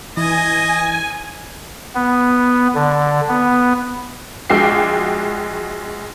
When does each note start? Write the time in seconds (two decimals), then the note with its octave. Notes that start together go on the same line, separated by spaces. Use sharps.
0.17 E3 D#5 G#5
1.95 B3
2.75 D3
3.29 B3
4.50 A#1 G#3 F#4 G5 D6 C7